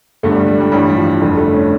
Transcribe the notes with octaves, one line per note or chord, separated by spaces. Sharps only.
G1 G2 D3 A3
G3
G3
G3
A1 G2 E3 G3
G3
F3
F1 F2 D3 G3
A3
C#4